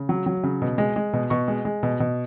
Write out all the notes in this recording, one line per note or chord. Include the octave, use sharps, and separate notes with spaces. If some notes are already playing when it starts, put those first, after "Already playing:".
Already playing: C#3
F#3
F#3
C#3
B2
G#3
G#3
B2
B2 C#6
G#3
G#3
B2
B2